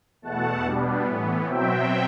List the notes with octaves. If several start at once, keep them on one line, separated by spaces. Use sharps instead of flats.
E2 B2 A3 F#5 A5
B2 G3 B3 D4
A2 E3 B3
B2 F#3 C4 E5 G5